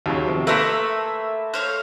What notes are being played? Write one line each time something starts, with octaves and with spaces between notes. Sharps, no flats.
D#2 C#3 F#3 F#4 G4 C#6
C3 F3
A3 A#3 A#4 B4 E5 C6 E6
A4 C5 C#5 F5 F6 F#6